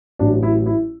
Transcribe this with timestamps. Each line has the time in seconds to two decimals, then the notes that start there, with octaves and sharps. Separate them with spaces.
0.19 A1 A2 F#3 D4
0.43 E4
0.66 E4